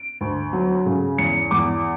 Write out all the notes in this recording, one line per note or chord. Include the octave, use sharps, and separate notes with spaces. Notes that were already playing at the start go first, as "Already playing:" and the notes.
Already playing: D7
D2
F#3
C#3
E2 C#7
E2 D6